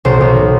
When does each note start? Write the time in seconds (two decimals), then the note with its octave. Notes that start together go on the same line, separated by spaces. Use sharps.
0.05 B1 C5
0.21 B1
0.37 A2